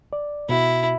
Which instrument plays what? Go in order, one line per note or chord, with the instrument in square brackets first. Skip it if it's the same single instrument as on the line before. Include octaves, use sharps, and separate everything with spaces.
[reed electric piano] D5
[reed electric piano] B2 F#4 [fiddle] E4